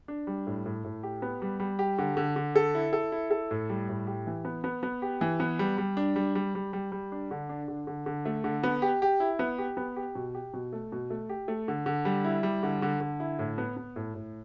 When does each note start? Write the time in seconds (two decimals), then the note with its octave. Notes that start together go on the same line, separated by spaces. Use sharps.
0.08 D4
0.27 G3
0.47 A2
0.66 A2
0.84 A2
1.03 G4
1.22 B3
1.42 G3
1.60 G3
1.79 G4
1.98 D3
2.17 D3
2.36 D3
2.56 A4
2.75 E4
2.93 A4
3.12 E4
3.31 A4
3.51 A2
3.69 G3
3.89 A2
4.07 G4
4.27 E3
4.45 B3
4.64 B3
4.83 B3
5.02 G4
5.21 E3
5.40 B3
5.59 G3
5.78 G3
5.97 D4
6.16 G3
6.35 G3
6.55 G3
6.73 G3
6.92 G3
7.12 D4
7.31 D3
7.49 D4
7.68 D3
7.87 D3
8.06 D3
8.25 A3
8.44 D3
8.63 B3
8.82 G4
9.02 G4
9.20 E4
9.39 B3
9.58 G4
9.77 B3
9.96 G4
10.15 B2
10.34 G4
10.54 B2
10.73 A3
10.92 B2
11.10 A3
11.29 G4
11.48 A3
11.68 D3
11.86 D3
12.05 G3
12.25 E4
12.43 G3
12.63 D3
12.82 D3
13.01 D3
13.20 E4
13.39 A2
13.58 B3
13.77 B3
13.96 A2
14.15 A2